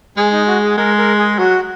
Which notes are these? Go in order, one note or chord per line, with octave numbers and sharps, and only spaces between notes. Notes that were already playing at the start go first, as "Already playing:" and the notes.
G#3 G#4
D#4
F#4
G#4
G#3 A#4
A#4
G#4
F#3 F#4